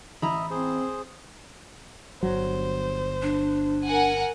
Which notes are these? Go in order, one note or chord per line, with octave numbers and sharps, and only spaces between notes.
A1 E4 D#5 E5 A#5 B5
C4 G#4 C5
G1 F#3 C5
D4
A#4 F#5 G#5